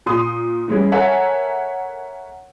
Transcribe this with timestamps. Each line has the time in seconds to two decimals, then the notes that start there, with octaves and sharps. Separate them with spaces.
0.06 A#2 C6 D#6
0.68 E3 G3 G#3 C#4 E4
0.92 A4 A#4 C#5 E5 F#5 G#5